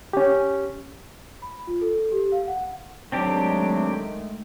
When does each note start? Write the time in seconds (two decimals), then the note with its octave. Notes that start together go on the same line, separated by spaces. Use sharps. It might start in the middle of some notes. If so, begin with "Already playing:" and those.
0.13 C#4 G4
1.42 B5
1.67 F4
1.81 A4
2.12 G4
2.32 F5
2.48 F#5
3.12 D#3 F#3 G#3 A3 C4 D4 G4